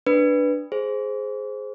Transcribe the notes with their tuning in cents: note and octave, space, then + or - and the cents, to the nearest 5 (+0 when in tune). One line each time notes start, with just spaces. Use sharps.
D4 +0 B4 +0
G#4 +10 C5 +0